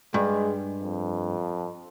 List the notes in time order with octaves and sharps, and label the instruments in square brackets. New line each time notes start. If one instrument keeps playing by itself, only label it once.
[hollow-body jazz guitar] G2 [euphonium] G#3
[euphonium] F2